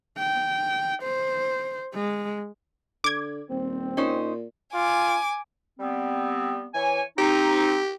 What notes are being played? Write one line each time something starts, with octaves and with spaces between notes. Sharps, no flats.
G5
C5
G#3
D3 D6 G#6
D#1 C4
A#2 C#4 D#4 C5
F4 G#5 D6
G3 B3 C4
E3 C#5 G#5
C4 D#4 G4